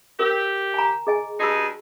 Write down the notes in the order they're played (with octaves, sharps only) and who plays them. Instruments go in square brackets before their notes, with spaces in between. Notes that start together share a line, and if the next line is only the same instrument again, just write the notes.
[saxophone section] G4 [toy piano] A#4 C5 E6
[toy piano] G#5 A#5
G#4 D#5 G#5
[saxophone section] G2 D#4 G#4 [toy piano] F#4 E6